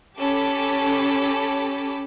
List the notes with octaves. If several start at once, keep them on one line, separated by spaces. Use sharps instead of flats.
C#4 G4 A4 A5 B5 D6